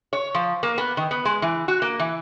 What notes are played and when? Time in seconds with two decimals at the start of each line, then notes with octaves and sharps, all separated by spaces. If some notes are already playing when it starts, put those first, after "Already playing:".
0.13 C#5
0.35 F3
0.63 A#3
0.78 B3
0.97 D#3
1.11 B3
1.25 G#3
1.42 E3
1.68 F#4
1.82 A#3
1.99 E3